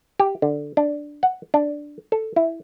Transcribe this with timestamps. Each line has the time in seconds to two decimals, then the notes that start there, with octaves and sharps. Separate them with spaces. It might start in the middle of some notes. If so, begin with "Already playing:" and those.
0.20 G4
0.42 D3
0.77 D4
1.23 F#5
1.54 D4
2.12 A4
2.36 E4